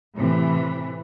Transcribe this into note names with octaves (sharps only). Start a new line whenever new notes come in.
A2 C3 E3